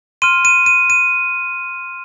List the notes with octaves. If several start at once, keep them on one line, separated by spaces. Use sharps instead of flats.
C6 F6 D#7
D#7
D#7
D#7